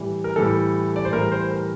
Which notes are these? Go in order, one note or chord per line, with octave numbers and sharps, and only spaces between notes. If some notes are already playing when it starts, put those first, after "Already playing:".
Already playing: A2 E3 G3
A#4
A2 E3 G3 A4
D5
C5
A2 E3 G3 A#4
C5
A#4